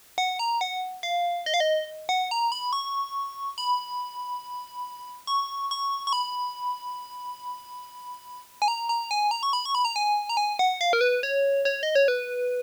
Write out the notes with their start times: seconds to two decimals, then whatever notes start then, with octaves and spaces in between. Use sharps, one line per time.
0.18 F#5
0.39 A#5
0.61 F#5
1.03 F5
1.46 D#5
1.54 F5
1.60 D#5
2.09 F#5
2.31 A#5
2.52 B5
2.73 C#6
3.58 B5
5.27 C#6
5.71 C#6
6.07 C#6
6.13 B5
8.62 G#5
8.68 A#5
8.89 A#5
9.11 G#5
9.31 A#5
9.43 C#6
9.53 B5
9.65 C#6
9.75 B5
9.85 A#5
9.96 G#5
10.29 A#5
10.37 G#5
10.59 F#5
10.81 F5
10.93 A#4
11.01 B4
11.23 C#5
11.65 C#5
11.83 D#5
11.95 C#5
12.08 B4